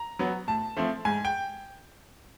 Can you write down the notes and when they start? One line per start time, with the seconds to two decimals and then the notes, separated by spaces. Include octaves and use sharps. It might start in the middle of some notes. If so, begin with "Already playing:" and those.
Already playing: A#5
0.19 F#3 B3
0.47 A2 A5
0.77 F3 A3 C4
1.05 G#2 G#5
1.25 G5